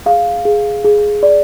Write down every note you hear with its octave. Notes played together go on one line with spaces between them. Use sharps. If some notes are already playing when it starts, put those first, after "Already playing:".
G#4 F5
G#4
G#4
D5